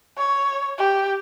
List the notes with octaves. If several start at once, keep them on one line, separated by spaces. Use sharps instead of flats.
C#5
G4